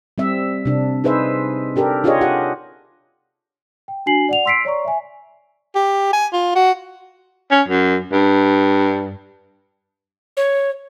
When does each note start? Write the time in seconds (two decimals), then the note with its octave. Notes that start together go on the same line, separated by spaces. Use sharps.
0.18 G3 C4 E5
0.65 C3 D4
1.04 D#4 G#4 B4 C5 E5
1.76 D4 G4 A4 A#4
2.04 D4 F4 G4 G#4 C#5 D#5
2.21 F4 G4 F#5
3.88 G5
4.06 D4 F#4 G#5 C7 F#7
4.29 D5 F#5 F7
4.45 C6 E6 B6 C7 D7
4.65 C#5 D5 A#5 C#6
4.85 E5 G#5
5.75 G4
6.13 G#5
6.33 F4
6.56 F#4
7.51 C#4
7.68 F#2
8.12 G2
10.37 C#5